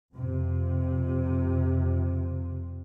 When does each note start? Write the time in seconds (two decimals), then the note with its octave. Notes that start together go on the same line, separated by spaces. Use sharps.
0.15 F2 C3